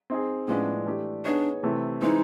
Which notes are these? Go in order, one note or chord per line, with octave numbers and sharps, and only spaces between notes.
C4 D#4 G#4
A2 F3 G#3 B3 C#4 D4
E3 A3 D4 G4
B3 D4 D#4 G#4 C#5
C3 E3 A3
E3 G#3 C4 D#4 E4